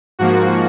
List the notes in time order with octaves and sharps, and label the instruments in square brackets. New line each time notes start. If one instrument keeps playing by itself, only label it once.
[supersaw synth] G#2 F3 A#3 F#4